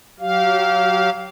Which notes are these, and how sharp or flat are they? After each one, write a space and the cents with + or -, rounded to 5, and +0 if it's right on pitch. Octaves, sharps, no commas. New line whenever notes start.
F#3 +0 G4 -30 F5 +0